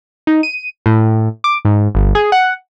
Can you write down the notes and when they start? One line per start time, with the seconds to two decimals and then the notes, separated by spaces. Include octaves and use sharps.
0.27 D#4
0.43 D#7
0.86 A2
1.44 D6
1.65 G#2
1.95 G1
2.15 G#4
2.32 F#5